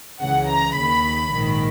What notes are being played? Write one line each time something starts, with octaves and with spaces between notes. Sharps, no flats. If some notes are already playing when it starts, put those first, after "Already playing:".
C#2 C#3 E3 F#5
A#5
D#2 D#3 B5
A#1 G#2 D#3